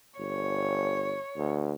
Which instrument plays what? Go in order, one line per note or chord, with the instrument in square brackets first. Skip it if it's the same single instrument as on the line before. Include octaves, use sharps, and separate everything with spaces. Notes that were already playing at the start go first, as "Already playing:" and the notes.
[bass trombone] G1 [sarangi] C#5
[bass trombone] D2